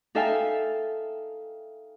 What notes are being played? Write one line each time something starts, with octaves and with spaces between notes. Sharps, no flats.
D#4 A4 E5 F5 G5 G#5